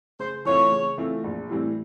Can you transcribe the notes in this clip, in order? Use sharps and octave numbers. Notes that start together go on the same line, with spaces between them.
C#3 C5
E3 A3 C4 F4 C#5
C#3
E3 A3 C4 F4
A#1
A2 E3 G3 C4